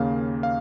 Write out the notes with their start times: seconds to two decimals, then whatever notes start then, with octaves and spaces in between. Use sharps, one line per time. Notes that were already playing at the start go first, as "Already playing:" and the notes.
Already playing: D#2 C#3 A#3 F5
0.43 F5